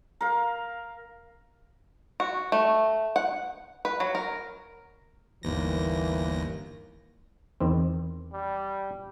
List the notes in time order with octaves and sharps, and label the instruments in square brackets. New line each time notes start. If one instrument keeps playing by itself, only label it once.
[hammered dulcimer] A#4 F5
[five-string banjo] F#4
A3
F#5
B4
F#3
A#4
[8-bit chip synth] G1 D#2 A#6 [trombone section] E3 A#3
[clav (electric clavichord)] E2 D#3 C4
[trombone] G3